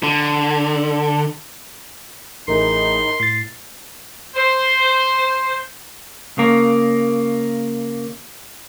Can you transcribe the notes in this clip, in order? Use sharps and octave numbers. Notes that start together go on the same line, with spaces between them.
D3
A1 A2 A3 D#4 G#4 A#4 C6
A2 A6 C7
C5
C#3 A#3